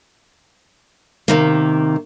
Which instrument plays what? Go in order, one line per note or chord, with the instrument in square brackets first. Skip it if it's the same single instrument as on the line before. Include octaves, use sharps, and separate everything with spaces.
[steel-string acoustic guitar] C3 D#3 A#3